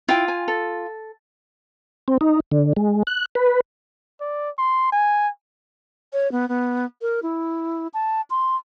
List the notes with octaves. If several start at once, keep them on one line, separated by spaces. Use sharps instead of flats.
E4 F4 G5
G#5
A4
C4
D#4
D3
G#3
F#6
B4
D5
C6
G#5
C#5
B3
B3
A#4
E4
A5
C6